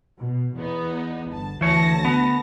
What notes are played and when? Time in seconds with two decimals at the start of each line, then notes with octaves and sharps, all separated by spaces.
0.18 B2
0.57 E2 B3 D#4
1.31 G1 A5
1.61 D2 E3 C#5 A5 A#6
2.05 B3